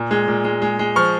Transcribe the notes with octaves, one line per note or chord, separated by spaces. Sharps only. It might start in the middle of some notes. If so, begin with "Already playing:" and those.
Already playing: A#2
G#3
A#2
G#3
G#3
G#3
F3 C#6 F6